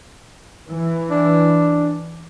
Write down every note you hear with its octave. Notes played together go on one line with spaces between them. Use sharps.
E3
D4